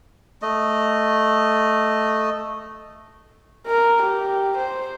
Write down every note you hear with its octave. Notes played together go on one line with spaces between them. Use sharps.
A3 D#5
A#4
G4
C5